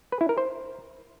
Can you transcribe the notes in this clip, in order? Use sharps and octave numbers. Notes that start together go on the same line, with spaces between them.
B4
E4
A#4
C5